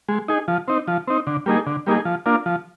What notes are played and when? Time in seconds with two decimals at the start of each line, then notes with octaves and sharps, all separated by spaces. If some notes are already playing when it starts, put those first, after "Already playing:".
0.08 G#3
0.28 D#4 G#4
0.48 F3
0.68 C4 D#4
0.87 F3
1.08 C4 D#4
1.27 D3
1.46 G3 A#3 D#4 G#4
1.66 D3
1.86 G3 A#3 D#4 G#4
2.05 F3
2.26 A#3 D4 F4
2.46 F3